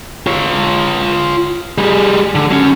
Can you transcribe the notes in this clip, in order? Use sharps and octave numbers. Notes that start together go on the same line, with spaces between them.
F4 C#5
G3 G#4
D3
F#3 C#4